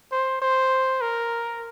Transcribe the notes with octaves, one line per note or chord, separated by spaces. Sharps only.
C5
C5
A#4